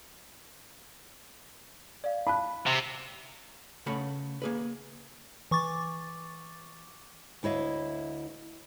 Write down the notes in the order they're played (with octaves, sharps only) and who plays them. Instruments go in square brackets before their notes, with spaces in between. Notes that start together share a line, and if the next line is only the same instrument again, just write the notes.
[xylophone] D5 F5
[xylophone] F5 A5 F#6 [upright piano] B5
[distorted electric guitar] C3
[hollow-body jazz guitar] C#3 A3 F#5 B5
A#3 G#4 B4
[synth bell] E3 C#6 D6 A6
[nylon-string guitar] D2 E4 C#5 D#5 F5